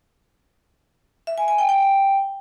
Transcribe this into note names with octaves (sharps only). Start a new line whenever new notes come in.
E5
G#5
G#5
G5
G5